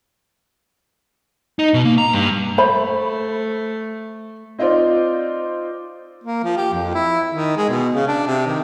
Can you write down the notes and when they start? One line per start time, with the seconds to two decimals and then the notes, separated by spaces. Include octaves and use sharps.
1.59 D#4
1.74 B2
1.85 A#3
1.98 A#5
2.13 G2
2.58 A3 C5 E5 B5
4.59 C4 D#4 F4 C5 D5
6.24 A#3
6.43 F3
6.57 G4
6.74 F2
6.94 E4
7.31 D#3
7.57 G#3
7.69 B2
7.94 C#3
8.07 D4
8.27 C3
8.47 D#3